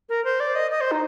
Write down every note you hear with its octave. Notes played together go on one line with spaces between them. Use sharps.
A#4
C5
D5
D#5
D#5
C5
D#4